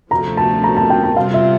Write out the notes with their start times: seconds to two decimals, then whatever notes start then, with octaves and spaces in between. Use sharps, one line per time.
0.11 D2 C3 F3 A3 A#5
0.37 A5
0.64 A#5
0.77 A5
0.90 G5
1.03 A5
1.16 C3 G3 C4 F4 F5
1.34 E5